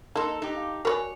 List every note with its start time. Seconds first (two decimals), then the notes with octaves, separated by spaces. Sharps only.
0.15 A#3 D#4 A4 D#5 A5 C6
0.42 D#4 G4
0.56 F5
0.85 F#4 A#4 B4 C#5 D5 G#5